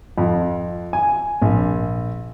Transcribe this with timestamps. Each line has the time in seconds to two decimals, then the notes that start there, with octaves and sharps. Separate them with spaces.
0.18 F2
0.93 G#5
1.42 A#1